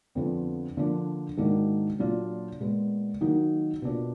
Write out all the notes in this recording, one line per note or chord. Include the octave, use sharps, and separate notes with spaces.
F2 D3 F3 B3
D3 F3 A#3 D4
G#2 D#3 A#3 D4 F#4
A#2 F#3 D4 F4
A#2 G#3 B3
D#3 F#3 A#3 D#4 F#4
B2 A#3 D4 F4